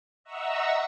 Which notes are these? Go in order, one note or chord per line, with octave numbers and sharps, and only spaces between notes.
D#5 E5 F#5 A#5 C#6 E6